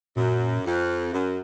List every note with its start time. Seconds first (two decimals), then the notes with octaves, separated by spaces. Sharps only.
0.16 F#2 A#2
0.65 F2
1.13 F#2